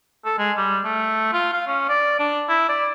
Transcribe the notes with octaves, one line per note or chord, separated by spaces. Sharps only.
A4
G#3
G3
A3
F4
F5
C#4
D5
D4
E4
D5